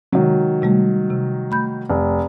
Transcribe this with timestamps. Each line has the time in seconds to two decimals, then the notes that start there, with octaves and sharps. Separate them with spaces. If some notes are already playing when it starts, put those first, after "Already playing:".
0.13 C3 D#3 F#3 G#3
0.62 C3 G3 A3
1.10 C3
1.51 A3 B5 G6
1.90 F1